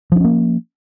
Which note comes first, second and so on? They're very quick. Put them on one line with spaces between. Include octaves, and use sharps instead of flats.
F3 D4 C#4 A#3